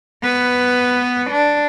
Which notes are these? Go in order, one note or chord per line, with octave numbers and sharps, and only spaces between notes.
B3 B4
D4